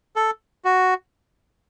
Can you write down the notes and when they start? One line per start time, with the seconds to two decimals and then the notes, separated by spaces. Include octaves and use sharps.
0.16 A4
0.65 F#4